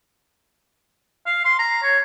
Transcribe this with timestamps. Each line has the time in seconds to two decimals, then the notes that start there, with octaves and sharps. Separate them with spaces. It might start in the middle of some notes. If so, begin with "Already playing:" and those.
1.26 F5
1.45 C6
1.59 A#5
1.83 C#5